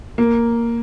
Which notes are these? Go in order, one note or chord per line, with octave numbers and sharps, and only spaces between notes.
A#3